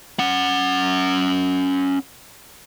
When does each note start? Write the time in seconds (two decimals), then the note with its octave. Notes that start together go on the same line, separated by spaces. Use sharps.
0.19 C#4 F#5